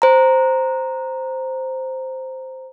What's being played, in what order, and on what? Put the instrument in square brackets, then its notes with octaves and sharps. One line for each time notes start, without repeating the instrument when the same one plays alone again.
[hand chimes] C5 A#5